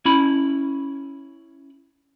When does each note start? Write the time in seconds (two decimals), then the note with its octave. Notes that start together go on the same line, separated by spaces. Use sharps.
0.05 C#4 E4 B5